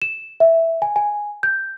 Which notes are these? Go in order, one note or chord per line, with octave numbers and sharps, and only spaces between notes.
E7
E5
G#5
G#5
G6